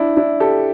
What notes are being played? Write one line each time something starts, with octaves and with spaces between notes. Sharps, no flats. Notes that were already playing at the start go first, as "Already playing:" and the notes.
Already playing: D4 E4
D4 E4
G4 A4